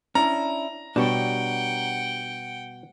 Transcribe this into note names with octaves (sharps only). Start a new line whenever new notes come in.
C#4 D4 E4 A#5
B2 G3 D4 G4 C#5 F#5 G5